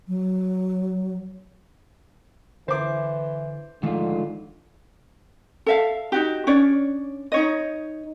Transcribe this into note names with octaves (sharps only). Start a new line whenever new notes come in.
F#3
D3 E3 C5 D6
G#2 D3 D#3 F3 A3 F4
A4 E5 F5
D#4 F#4 G4
C#4 D4 C#5 D5
D#4 C#5 D#5